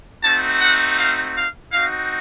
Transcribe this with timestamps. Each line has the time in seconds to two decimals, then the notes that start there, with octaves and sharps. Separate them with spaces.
0.24 A3 C4 D#4 F#4 A5
0.61 F#5
0.99 F5
1.36 F5
1.73 C4 D#4 F#4 F5